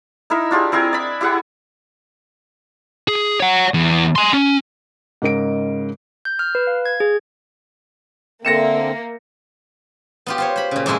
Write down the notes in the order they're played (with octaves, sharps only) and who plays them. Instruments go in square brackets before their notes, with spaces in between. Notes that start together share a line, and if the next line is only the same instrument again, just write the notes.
[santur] D#4 E4 A#4 E5
D4 F4 G4 G#4
C4 E4 G#4 A#4
D5 B5
E4 G4 G#4 F#5
[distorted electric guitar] G#4
C#5 F#5
E2
G#5 C6
C#4
[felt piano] G#2 C#3 A#4 D#5 D7
[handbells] G6
F6
B4
F5
G#6
G#4
[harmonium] D3 C4 [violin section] A#3 [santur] E5 [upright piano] A#6 C#7 E7
[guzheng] B3 F4 G4
F4 C5 C#5
C5 B5
A#2 C#3
F2 A#2 G#3 E4 F4